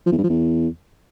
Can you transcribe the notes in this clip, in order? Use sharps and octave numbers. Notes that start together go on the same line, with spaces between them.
F3
E2
G2
F3
E2